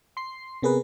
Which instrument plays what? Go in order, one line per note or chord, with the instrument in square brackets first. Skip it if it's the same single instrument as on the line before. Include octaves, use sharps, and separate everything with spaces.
[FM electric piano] C6 C7
C3 B3 G#4 A#4 B4